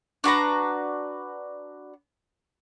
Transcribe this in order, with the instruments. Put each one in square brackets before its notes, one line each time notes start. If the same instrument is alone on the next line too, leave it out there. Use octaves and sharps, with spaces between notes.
[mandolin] D4 F#4 B4 A#5